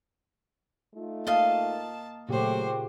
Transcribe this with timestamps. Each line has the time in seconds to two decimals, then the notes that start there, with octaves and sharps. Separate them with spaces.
0.95 A3 D#4 F4
1.27 A#3 D#5 F5 A5
2.29 A#2 C#3 F#3 A3 F#4 G4 C5